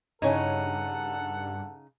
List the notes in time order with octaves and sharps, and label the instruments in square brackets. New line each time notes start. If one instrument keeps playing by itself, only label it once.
[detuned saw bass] G2 [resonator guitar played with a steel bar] C#3 D#4 [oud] E4 C#5 [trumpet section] A4 F#5